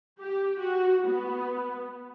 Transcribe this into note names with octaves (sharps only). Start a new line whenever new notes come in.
G4
F#4
B3